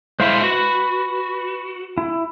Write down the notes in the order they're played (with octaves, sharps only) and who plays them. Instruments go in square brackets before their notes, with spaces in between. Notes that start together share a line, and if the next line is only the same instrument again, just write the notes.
[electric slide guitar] G#3 E4 E5 [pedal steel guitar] C5 F5 C6
[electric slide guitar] F#4 [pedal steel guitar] B4
[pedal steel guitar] E4